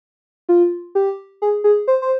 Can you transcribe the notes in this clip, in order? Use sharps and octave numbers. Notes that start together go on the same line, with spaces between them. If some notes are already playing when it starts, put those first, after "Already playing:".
F4
G4
G#4
G#4
C5
C5